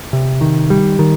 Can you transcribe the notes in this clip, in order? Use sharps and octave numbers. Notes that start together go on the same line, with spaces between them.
C3
D#3
G3
D#3